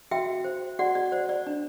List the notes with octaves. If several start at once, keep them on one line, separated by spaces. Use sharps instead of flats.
F#4 E5 G5
C5
F#4 D5 F#5
D5
C5 D5
D5
D4